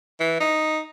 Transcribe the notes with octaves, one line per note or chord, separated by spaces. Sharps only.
E3
D#4